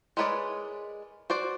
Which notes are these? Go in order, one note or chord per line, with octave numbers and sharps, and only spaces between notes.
G#3 A#4 B4 C#5 D5
F#4 C5 D5